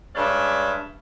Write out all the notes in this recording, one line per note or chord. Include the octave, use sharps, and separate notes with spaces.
G2 G#3 C#4 D5 E5